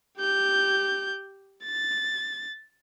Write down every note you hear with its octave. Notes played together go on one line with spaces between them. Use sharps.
G4 G6
A6